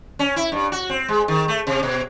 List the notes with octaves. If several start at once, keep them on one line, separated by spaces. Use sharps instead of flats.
C#4
E4
G2
F#4
C4
G#3
D#3
A3
C3
B2